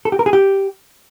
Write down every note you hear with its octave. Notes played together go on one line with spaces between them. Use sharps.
A4
G4
A#4
G#4
G4